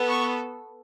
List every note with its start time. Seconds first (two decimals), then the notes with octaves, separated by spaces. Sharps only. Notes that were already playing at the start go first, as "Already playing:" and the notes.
Already playing: B3 A4
0.08 C#6